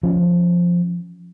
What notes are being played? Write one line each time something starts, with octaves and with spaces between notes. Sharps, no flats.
F3 C#4